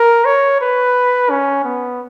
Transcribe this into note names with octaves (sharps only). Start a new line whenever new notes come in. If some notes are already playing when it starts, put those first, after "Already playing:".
Already playing: A#4
C#5
B4
C#4
B3